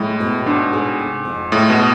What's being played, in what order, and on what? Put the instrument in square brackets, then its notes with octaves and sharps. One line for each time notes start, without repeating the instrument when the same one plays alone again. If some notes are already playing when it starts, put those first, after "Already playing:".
Already playing: [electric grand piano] A2 [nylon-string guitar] G#3 E4
[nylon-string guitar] B2
[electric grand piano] G#2 [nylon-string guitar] D4
[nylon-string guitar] G#4
C3
F2
[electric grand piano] A2 [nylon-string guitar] G#3
[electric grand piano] B2
[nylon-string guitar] B3